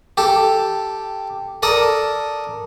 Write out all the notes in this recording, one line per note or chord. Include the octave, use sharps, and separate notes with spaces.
G4 A4
A4 A#4 D5 D#6